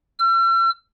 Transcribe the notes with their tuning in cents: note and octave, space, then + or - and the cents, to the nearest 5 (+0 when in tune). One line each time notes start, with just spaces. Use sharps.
E6 +45